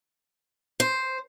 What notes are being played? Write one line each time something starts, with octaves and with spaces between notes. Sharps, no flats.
C5